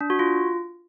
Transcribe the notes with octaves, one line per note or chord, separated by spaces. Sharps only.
D4
F#4
F4